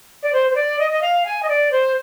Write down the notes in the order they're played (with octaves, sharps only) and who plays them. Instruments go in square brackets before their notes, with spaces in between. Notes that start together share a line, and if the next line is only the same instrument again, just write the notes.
[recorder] D5
C5
C5
D5
D#5
D#5
F5
G#5
D#5
D5
C5